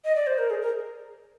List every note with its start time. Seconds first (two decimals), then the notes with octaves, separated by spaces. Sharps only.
0.04 D#5
0.15 D5
0.27 C5
0.38 A#4
0.50 G#4
0.62 A#4